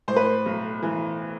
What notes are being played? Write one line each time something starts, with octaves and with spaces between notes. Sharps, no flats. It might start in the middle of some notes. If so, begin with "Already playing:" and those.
A2 C5
B4
C5
B1
E3